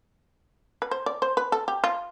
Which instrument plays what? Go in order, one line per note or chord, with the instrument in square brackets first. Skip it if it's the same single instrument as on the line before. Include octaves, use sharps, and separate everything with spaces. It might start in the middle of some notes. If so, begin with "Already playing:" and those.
[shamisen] B4
C5
D5
C5
B4
A4
G4
F4